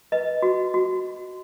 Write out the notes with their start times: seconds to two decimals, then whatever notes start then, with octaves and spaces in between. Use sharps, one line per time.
0.12 B4 D#5
0.42 F#4
0.74 F#4